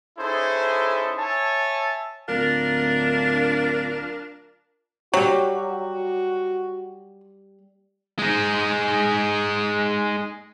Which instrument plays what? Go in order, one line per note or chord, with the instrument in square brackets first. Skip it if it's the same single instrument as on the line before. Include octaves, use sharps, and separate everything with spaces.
[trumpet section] C#4 D#4 E4 G#4 A4 C5
C#5 E5 G#5 A5
[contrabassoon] D1 [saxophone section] D4 F4 A#4
[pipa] F#3 [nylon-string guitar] G3 G4 [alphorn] F#4
[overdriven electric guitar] G#3 D#4